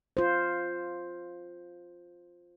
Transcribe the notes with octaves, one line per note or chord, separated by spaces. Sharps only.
F4 C5